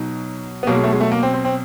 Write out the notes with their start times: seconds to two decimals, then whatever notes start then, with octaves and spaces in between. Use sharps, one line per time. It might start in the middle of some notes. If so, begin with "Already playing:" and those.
Already playing: B2 F#3 D#4
0.63 B3
0.67 B2 F#3 A#3
0.75 G#3
0.84 A3
0.92 G#3
1.00 A3
1.12 A#3
1.23 C4
1.34 C4
1.44 C4